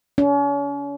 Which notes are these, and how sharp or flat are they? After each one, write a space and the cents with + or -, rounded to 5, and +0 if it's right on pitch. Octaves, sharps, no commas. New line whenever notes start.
C#4 +40